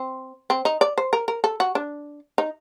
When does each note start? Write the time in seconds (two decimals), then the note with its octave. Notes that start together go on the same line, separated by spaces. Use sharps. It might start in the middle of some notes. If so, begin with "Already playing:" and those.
Already playing: C4
0.50 C4
0.65 D#4
0.81 D5
0.98 C5
1.13 A#4
1.28 A#4
1.44 A4
1.60 F#4
1.75 D4
2.38 D#4